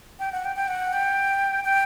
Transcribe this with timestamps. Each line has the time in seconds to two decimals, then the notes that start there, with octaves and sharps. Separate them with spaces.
0.19 G5
0.32 F#5
0.45 G5
0.56 G5
0.68 F#5
0.93 G5
1.64 G5